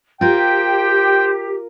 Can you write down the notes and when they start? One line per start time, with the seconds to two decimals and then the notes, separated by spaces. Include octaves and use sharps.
0.21 F4 G4 A#4 C5 G5